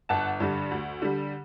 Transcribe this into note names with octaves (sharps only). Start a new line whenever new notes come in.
G1 F#5 A5
G2 D3 G3
D2
D3 G3